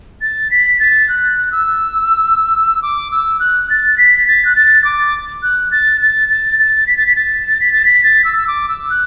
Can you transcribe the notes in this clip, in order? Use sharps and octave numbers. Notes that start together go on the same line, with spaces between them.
A6
B6
A6
F#6
E6
D6
E6
F#6
A6
B6
A6
F#6
A6
D6
F#6
A6
A6
A6
A6
B6
A6
B6
A6
B6
A6
B6
A6
E6
E6
D6
E6
F#6